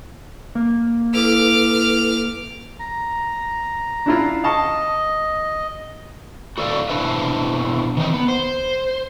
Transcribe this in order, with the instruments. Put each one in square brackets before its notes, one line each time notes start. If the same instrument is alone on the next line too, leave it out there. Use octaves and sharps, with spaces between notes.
[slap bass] A#3
[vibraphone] E4 A4 B4 [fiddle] D6 F6
[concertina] A#5
[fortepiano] D4 E4 F4
[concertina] D#5 [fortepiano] F5 A5 C#6
[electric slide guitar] F#4 A4 D5 E5 F5
B2 D4 E4 B4 C5 E5
D#3 E3 C4 D#4
B3
C5